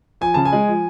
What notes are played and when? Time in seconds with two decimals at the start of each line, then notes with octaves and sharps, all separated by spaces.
0.21 F3 G#5
0.34 C#3 A5
0.45 G#5
0.53 G#3
0.68 F3